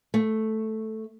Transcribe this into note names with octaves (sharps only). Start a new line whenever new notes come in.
A3